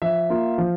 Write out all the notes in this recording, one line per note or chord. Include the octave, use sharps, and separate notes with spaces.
F3 E5
A#3 F4
F3